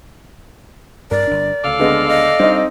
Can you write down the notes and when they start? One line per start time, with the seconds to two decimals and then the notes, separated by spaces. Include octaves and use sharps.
1.11 G2 A#4 D5
1.27 G1 D4
1.64 D2 C#3 A4 D5 F5
1.79 D3 G#3 B3 D#5
2.09 D#5
2.40 G3 C4 D4 D#4